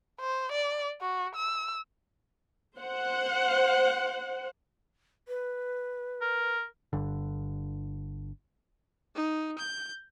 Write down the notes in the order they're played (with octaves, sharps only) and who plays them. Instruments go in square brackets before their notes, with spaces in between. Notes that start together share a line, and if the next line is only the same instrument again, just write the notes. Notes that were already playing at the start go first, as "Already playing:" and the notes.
[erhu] C5
D5
F#4
E6
[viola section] C5 F#5
[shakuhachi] B4
[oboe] A#4
[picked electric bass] G1 G2 D3
[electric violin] D#4
G6